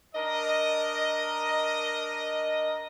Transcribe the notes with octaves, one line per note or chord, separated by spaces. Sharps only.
D4 A#4 D#5